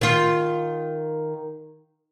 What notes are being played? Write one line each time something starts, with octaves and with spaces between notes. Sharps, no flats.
D#3 F4